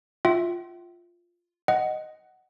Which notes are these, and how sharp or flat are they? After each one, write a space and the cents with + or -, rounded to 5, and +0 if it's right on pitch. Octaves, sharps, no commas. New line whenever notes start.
F4 +0 E5 +0 G5 -45
D#5 +0 F#5 +15